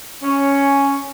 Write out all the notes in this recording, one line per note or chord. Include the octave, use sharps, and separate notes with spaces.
C#4